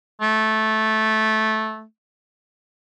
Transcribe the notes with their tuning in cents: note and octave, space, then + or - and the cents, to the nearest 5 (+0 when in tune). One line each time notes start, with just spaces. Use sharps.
A3 -10